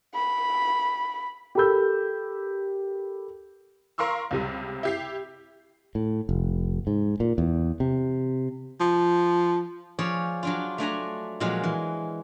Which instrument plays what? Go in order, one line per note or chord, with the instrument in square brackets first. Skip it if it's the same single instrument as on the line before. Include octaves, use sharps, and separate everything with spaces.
[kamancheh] B5
[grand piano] G4 A4 A#4 B5 E6 G6
[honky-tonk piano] A#4 F5 C6 C#6 E6
C#2 C3 G3
E4 G4 C7
[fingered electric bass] A2
F1
G#2
A#2
E2
C3
[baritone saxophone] F3
[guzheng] F3 G#4 C#5 D5
F#3 D4 F4
A3 D4 G#5 A#5
A#2 F3 F#3 G#3
E3